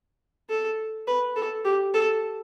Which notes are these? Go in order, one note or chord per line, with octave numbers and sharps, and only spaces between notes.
A4
B4
A4
G4
A4